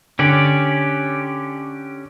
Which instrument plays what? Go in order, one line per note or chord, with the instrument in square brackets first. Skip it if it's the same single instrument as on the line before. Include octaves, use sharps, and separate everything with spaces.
[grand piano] D3 [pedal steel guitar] C#4 G4 D5